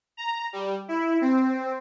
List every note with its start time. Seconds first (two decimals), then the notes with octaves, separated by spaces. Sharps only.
0.17 A#5
0.53 G3
0.88 E4
1.21 C4